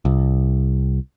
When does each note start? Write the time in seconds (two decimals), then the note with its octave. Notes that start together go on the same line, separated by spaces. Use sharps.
0.05 C2